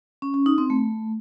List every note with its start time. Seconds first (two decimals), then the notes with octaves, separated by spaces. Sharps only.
0.22 C#4
0.34 C#4
0.46 D#4
0.58 C4
0.70 A3